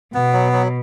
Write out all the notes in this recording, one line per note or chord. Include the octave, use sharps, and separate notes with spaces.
B2 B3
F#3
F#3